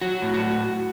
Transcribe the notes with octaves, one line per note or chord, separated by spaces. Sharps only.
F#3 F#4
A2
F#4